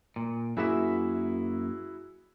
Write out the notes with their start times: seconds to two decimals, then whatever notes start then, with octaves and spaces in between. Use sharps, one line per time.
0.16 A#2
0.57 F#2 A#3 E4 F#4 G#4 E5